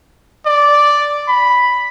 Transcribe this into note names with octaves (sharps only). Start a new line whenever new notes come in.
D5
B5